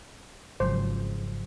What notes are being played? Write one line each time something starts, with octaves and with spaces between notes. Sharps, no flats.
G#1 C#3 F3 F#3 C5